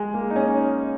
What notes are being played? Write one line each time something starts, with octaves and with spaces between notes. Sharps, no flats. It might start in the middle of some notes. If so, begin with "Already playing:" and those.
Already playing: G#3
A#3
D#4
C#4